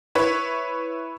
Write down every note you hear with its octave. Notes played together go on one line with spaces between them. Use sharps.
E4 B4 C#5